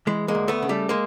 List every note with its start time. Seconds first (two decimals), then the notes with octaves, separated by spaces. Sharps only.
0.07 E3 G#3
0.28 G#3 A#3
0.35 D2
0.48 A3 B3
0.63 C#3
0.69 G3 A3
0.89 G#3 A#3